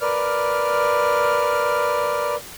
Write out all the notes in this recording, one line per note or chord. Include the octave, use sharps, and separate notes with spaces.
A#4 B4 D5 F6